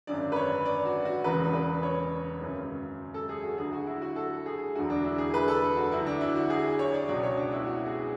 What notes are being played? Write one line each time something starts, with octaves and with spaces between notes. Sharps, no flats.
G#1 F#2 D3 D5
B4
C#5
D5
F#4
F#4
E1 E2 C#3 B4
B4
C#5
G#1 F#2 C#3 F#3
A4
G#4
F#4
D2 D3 F#3 G#4
F#4
E4
F#4
A4
G#4
E1 D2 D3 F#3 F#4
D4
E4
G#4
B4
A4
F#4
D2 D3 F#3 E4
D4
E4
F#4
G#4
C#5
D5
C#2 B2 F#3 D5
C#5
D4
E4
F#4
G#4